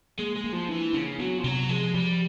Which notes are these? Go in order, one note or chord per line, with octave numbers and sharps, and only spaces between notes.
G#3 A#3
G#3
A#3
F3
E3 D4
C#3 D4
F#3 B3
F3
C3 F#3
F3 G#3
F3 G3